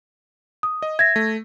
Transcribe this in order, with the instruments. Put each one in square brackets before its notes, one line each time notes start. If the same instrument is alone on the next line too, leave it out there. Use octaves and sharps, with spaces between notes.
[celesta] D#6
[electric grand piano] D#5
[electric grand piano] E5 [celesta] G#6 A#6
[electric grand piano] A3